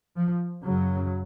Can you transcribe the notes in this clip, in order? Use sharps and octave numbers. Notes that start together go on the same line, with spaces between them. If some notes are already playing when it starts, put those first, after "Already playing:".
F3
F#2 C#3 F#3